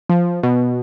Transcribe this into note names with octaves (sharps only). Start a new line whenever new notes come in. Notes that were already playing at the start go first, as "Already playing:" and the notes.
F3
B2